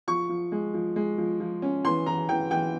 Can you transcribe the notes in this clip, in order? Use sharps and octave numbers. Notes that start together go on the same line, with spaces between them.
F3 C#6
F3
G#3
F3
G#3
F3
F3
C#4
E3 C6
E3 A#5
E3 G5
E3 G5